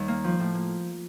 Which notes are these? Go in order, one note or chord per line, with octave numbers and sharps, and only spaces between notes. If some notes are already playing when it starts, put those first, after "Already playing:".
Already playing: D#2 G3
A#3
F3
A2
A#3